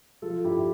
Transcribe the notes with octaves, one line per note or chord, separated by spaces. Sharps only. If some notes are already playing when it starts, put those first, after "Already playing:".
F3 F4 A4
G2 E4 G4
G4